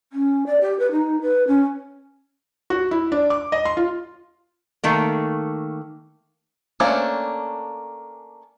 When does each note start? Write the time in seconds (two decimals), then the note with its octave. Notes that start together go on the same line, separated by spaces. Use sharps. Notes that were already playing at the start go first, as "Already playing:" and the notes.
0.13 C#4
0.46 D5
0.61 G4
0.80 B4
0.92 D#4
1.22 B4
1.47 C#4
2.70 F#4
2.91 E4
3.12 D4
3.30 D6
3.52 D#5
3.65 C6
3.77 F4
4.84 D#3 A3 A#3
6.80 A3 A#3 C#4 D4 C5